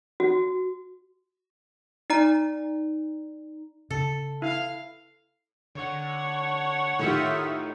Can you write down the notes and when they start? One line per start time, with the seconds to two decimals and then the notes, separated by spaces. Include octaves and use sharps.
0.20 F#4
2.10 D#4 D5 A#5
3.90 C#3 A4
4.42 E4 F5
5.75 D3 C#5 F#5
6.99 A2 D#3 D#4 F4 G4 E5